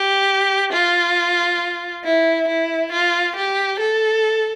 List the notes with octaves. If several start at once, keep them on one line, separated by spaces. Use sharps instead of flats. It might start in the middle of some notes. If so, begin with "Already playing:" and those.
Already playing: G4
F4
E4
E4
F4
G4
A4